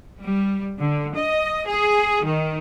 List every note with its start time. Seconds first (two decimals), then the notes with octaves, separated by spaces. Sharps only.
0.22 G3
0.79 D3
1.16 D#5
1.68 G#4
2.24 D#3